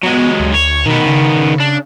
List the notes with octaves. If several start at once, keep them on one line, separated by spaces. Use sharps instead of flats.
F#3 G#3 B3
D2
C#5
B2 D#3 B3
C#3
D4